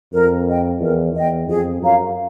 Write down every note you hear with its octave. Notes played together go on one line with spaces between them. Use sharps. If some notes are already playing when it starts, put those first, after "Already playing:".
F2 A#4
D#5 G5
E2 A#4
E2 D#5 G5
F2 G#4
F#2 C#5 F5 A#5